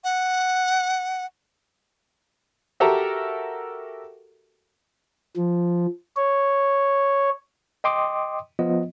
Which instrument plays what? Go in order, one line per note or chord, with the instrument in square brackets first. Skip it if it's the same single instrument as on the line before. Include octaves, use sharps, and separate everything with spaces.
[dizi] F#5
[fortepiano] F#4 G4 A4 A#4 E5 A#5
[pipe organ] F3
C#5
[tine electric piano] D#5 G5 C6 D6 D#6
F3 B3 F4 D#5